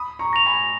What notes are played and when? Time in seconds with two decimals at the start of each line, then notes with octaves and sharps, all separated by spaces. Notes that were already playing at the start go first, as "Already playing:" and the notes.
Already playing: B5 D#6
0.19 A#5 C#6
0.33 A#6 F7
0.46 G#5 B5